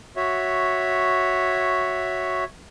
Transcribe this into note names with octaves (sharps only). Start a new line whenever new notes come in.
F#4 C#5 E5